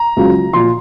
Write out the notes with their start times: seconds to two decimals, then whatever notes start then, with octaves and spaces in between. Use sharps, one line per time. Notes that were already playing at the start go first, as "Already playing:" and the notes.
Already playing: A#5
0.16 C#2 C#3 F#3
0.53 A#2 F3 C6